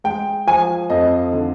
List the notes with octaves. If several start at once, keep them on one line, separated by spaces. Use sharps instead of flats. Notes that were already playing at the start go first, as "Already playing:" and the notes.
G#3 G5
F3 G#5
F2 D#5
D3